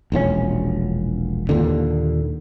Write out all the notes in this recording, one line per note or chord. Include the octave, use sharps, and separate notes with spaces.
E1 A#1 G#2 C#4
D#2 A#2 D3